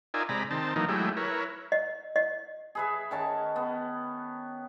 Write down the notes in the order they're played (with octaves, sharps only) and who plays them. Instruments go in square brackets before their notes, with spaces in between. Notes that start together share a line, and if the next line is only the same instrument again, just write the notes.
[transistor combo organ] D#4 F4 A#4 D5 E5 G#5
C3 G#3 D5 A#5 B5
D#3 C4 A5
D#3 E3 F#3 A#3 D#4
F#3 G#3 A3 E4 G4
E4 A#4 B4 C#5
[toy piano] D#5
D#5
[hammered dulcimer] G#4 B4 E5
D#3 C#4 A5
B3